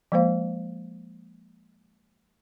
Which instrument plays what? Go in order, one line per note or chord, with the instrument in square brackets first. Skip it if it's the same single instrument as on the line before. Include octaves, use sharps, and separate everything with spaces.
[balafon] F3 G#3 A#3 C5 F5